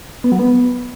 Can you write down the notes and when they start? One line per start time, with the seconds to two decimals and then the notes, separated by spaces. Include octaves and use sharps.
0.24 B3
0.32 F#3
0.39 B3